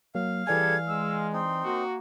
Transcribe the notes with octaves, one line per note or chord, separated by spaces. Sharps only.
F#3 A#3 F5
E3 G3 G#4 A4 D5 G#5 G#6
G#3 E6
C4 D#4 C6
A#3 F#4